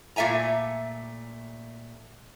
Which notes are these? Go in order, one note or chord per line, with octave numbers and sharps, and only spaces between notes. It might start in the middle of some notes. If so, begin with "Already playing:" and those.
A#2 A3 E5 G#5 A#5